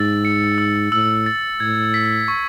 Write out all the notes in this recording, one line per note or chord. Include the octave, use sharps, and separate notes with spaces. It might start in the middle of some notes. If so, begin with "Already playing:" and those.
Already playing: G#2 E6 A6
C#7
E6
A2 E6
A6
A2 G#6
B6
C#6